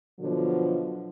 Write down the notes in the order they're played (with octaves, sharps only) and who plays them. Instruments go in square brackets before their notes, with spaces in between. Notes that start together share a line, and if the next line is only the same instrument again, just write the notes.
[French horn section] B2 D3 F3 F#3